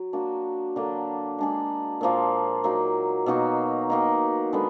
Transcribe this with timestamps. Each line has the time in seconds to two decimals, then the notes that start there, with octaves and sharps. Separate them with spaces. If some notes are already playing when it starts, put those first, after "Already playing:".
Already playing: F#3
0.13 A#3 D4 F#4
0.76 D3 F#3 A#3 D4
1.38 G#3 D4 G#4
2.01 A#2 F3 A#3 F4
2.64 F#3 A#3 D#4
3.26 B2 A#3 D#4 F#4
3.90 D#3 A#3 D#4
4.53 D3 G#3 B3